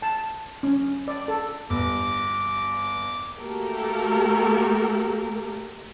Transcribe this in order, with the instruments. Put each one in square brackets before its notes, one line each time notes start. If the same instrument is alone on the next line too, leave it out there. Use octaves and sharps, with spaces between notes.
[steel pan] A5
C#4
D5
A4
[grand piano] G1 [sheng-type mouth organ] D6
[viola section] A3 A#3 F#4 G4 A4 A#4